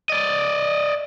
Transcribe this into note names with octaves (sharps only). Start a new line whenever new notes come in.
D5 D#5